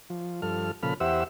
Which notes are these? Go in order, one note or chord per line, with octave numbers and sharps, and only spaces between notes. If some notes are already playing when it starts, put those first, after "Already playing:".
F3
G2 F3 A4 F6
A#2 C#3 F3 A4 B5 F6
E2 G4 C5 E5 F#5 E6